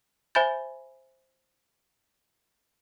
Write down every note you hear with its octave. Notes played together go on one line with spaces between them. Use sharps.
C5 E5 G#5 B5 G6 A6